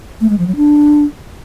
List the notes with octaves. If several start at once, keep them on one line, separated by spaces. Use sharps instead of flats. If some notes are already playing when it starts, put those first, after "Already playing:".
A3
G#3
F3
F#3
D4